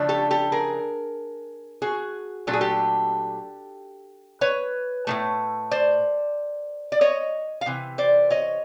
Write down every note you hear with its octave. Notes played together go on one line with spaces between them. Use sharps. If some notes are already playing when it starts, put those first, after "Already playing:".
Already playing: C#3 F3 A3 D4
G4 A4
G4 A4
G#4 A#4
F#4 G#4
A#2 F#3 A3 D4 A4
G#4
G4 A4
B4 C#5
A2 E3 A3
C5 D5
D5
C#5 D#5
F5
C3 E3
C5 D5
C#5 D#5